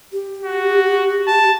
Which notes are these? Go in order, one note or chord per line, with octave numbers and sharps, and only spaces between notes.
G4
F#4
A5